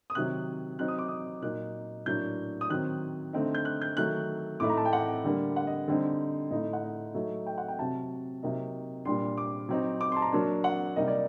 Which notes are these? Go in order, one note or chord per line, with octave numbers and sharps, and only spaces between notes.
D#6
C3 D#3 F#3 F#6
F#3 C4 D#4 F#6
D#6
D6
D#6
A#2 F#3 A#3 D#4 F#6
A2 F#3 A#3 D4 G6
D#6
D#3 F#3 C4 F#6
D3 A3 C4 D#4
G6
F#6
G6
D#3 F#3 A3 F#6
A2 A3 D#4 D6
A#5
A5
G5
F#5
D3 G3 A#3
F#5
D#5
D3 G3 C4 D#4
A2 A3 D#4 D#5
F#5
D#5
F#3 A3 D#4
G5
F#5
G5
C3 F#3 C4 A5
C3 F#3 A#3 D#4
A#2 G3 D4 C6
D6
F#3 C4 D#4
D6
C6
A5
A#5
F#3 A#3 D4 A5
F#5
C3 G3 A#3 D#4 D#5
D5